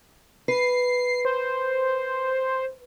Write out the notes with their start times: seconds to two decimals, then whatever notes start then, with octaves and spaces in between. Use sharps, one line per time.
0.48 B4 C7
1.25 C5